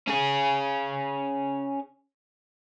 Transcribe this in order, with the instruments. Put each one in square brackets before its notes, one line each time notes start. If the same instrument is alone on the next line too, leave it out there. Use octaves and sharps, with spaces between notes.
[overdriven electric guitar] C#4 G#4